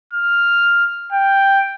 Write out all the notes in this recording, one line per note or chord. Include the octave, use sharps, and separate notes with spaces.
F6
G5